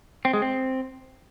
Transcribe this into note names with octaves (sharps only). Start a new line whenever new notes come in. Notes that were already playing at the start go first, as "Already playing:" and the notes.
C4
G#3
C4